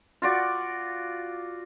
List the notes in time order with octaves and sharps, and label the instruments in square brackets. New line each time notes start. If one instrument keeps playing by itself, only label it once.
[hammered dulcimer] F4 F#4 D5